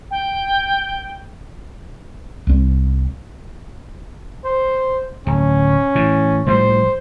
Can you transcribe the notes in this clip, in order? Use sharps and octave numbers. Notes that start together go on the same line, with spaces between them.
G5
C2 C4
C5
D1 C#4
A2 E3
A2 F3 G3 C5